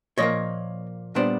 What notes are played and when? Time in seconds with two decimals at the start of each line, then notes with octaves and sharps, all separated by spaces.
0.18 A#2 F3 A#3 C#5 D#5
1.15 A#2 G3 B3 D4 C5 D5